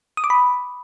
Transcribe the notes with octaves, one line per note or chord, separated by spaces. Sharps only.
D#6
D6
B5